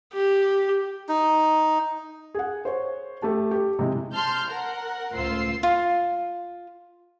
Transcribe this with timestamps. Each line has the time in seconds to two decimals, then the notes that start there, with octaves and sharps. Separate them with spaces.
0.14 G4
1.09 D#4
2.35 G#4 F#5
2.65 C5 C#5
3.22 A3 G4 A5
3.51 G4
3.79 C3 G#3 E4
4.13 A5 C6 F6 G6
4.49 A#4 F#5
5.14 C#2 A2 F4 C5 E6 C7
5.63 F4